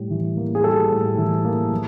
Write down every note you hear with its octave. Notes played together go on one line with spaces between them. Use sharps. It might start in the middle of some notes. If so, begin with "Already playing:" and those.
Already playing: A2 G3
E3
A#3
G#4
G3 A4
A2
E3
A#3
F3